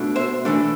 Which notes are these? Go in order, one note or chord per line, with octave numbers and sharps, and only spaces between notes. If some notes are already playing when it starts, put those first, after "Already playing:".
Already playing: B2 A3 D4
C5 E5
E3 A3 D4